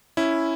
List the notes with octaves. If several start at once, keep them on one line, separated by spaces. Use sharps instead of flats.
C#4 E4